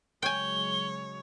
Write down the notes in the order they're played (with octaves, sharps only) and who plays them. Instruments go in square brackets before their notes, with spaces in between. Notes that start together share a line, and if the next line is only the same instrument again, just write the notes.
[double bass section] C#3 F#3 G#3 [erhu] C#5 [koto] G5 G#5 [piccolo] G7